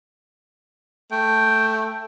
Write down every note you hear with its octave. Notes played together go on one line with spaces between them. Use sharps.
A3 G5